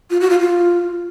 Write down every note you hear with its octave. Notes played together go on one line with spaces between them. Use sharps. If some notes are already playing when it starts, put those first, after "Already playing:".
F4
F#4
F4
F4